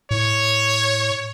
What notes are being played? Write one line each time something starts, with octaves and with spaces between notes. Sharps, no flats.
A2 C#5